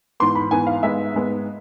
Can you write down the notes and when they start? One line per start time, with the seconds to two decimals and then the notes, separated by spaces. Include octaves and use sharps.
0.20 G#2 E3 B3 C6
0.35 B5
0.51 G#2 E3 B3 G#5
0.67 F5
0.82 G#2 G#3 B3 E5
1.14 G#2 G#3 B3